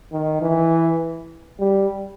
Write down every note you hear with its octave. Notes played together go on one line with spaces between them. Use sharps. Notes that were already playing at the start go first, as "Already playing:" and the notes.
D#3
E3
G3